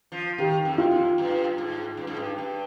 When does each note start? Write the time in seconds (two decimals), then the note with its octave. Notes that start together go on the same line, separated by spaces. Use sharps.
0.12 F3
0.38 D#3 G4
0.65 F2
0.78 F4
0.91 F2
1.18 G2
1.58 G#2
1.97 G2
2.07 G#2
2.17 G2
2.38 G2